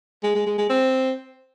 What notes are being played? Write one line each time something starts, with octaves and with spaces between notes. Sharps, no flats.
G#3
G#3
G#3
G#3
C4